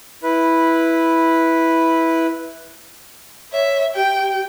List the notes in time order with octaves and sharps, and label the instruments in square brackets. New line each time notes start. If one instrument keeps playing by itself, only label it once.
[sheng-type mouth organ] E4 B4
[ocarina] C#5 [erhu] E5
[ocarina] G4 [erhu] G5